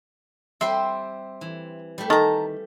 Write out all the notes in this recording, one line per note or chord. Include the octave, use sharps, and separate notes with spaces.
G3 C4 C5 E5 C6
E3
G3 A3
D#3 A5 A#5